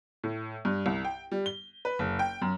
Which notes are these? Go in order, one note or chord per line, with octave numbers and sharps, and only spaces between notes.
A2
G2
C2
G5
G3
G7
B4
F#1
G5
F#2